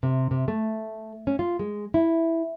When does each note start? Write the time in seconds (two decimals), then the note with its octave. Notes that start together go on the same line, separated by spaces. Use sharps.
0.03 C3
0.31 C3
0.48 A3
1.27 C#4
1.39 F4
1.59 G#3
1.94 E4